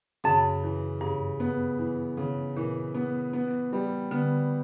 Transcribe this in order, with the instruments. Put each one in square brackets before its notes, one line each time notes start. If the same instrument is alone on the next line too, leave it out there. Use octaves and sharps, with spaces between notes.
[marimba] F#2 [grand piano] C#3
[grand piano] E3
[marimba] G2 [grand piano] C#3
[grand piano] B3
E3
C#3
[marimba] A#2 [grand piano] E3
[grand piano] B3
B3
G3
[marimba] D3 [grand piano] B3